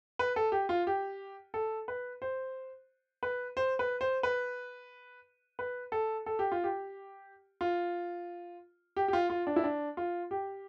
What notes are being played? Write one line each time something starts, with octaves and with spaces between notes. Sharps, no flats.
B4
A4
G4
F4
G4
A4
B4
C5
B4
C5
B4
C5
B4
B4
A4
A4
G4
F4
G4
F4
G4
G4
F4
F4
D4
E4
D4
F4
G4